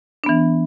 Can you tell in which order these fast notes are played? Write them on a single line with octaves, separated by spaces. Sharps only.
D4 B3 E3